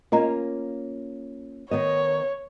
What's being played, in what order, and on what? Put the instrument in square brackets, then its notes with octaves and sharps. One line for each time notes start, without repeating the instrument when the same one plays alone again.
[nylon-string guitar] A#3 C#4 F4 [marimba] A#4 D#5 A#5
[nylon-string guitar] D#3 B3 D#5 [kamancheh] C#5